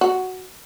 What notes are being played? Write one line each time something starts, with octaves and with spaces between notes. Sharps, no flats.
F#4